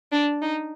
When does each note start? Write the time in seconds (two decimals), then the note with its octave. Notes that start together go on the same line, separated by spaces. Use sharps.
0.12 D4
0.42 D#4